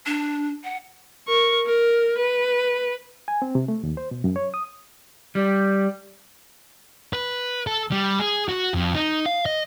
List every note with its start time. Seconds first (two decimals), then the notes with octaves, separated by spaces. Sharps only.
0.06 D4
0.64 F#5
1.28 A#4 C#6
1.66 A#4
2.18 B4
3.28 G#5
3.42 C4
3.55 C3
3.68 A3
3.83 D#2
3.97 C5
4.11 B2
4.24 F#2
4.36 C#5
4.54 D#6
5.35 G3
7.13 B4
7.67 A4
7.91 G3
8.20 G#4
8.49 F#4
8.74 F2
8.95 D#4
9.26 F5
9.46 D#5